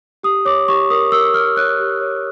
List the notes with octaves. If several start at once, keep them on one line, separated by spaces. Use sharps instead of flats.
G4 D#6
C#5 D6
G4 C#6
A#4 D#6
A#4 E6
A#4 F6
C#5 F#6
G4
C#5